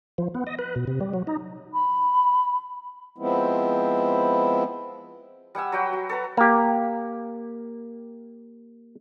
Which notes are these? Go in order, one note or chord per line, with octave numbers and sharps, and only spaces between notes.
F3
B3
D#5
B4
B2
C3
G3
F#3
D#4
B5
F3 G#3 B3 C4 E4
G3 F#5 G#5 E6
F#3 F#4 G5 B5
F#4
A4 B4 A#5
A#3 G4